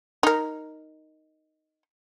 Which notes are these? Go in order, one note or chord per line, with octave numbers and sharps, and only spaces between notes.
D#4 A#4